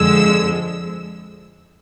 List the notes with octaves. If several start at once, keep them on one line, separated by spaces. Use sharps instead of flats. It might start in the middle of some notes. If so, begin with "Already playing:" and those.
Already playing: F2 D3 F3 G#3 E6